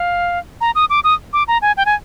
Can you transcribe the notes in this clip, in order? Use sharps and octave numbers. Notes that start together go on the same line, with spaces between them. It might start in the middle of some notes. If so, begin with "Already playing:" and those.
Already playing: F5
A#5
D#6
D6
D#6
D6
A#5
G#5
G5
G#5